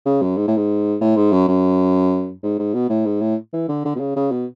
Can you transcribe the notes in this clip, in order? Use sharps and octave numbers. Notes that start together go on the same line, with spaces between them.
C#3
F#2
G#2
A2
G#2
A2
G#2
F#2
F#2
G#2
G#2
B2
A2
G#2
A2
E3
D3
D3
B2
C#3
C#3
B2